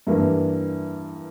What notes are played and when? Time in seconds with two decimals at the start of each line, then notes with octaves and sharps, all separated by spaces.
0.07 G2 E3 A#3 E4